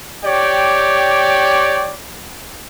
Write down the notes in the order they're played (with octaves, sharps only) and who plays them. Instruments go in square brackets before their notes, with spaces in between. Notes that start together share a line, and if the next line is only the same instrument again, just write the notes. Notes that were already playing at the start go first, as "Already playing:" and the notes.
[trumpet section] G4 C#5 D5 G5